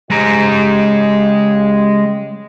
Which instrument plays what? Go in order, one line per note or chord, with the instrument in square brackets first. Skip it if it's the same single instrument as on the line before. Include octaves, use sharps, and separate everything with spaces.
[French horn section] C#3 G4 D#5 [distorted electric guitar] G#3 A#5